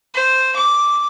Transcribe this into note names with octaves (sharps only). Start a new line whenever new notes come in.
C5
D6